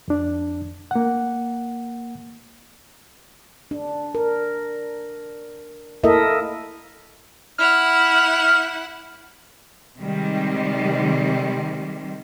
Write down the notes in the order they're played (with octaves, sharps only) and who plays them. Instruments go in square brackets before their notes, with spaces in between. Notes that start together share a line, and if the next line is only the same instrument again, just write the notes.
[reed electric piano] F2 D4
A#3 F#5
[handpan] D4
A#4
A#3 E4 A4 A#4 D#5 E5
[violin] E4 F#5 [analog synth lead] F6
[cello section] C3 D#3 G3 G#3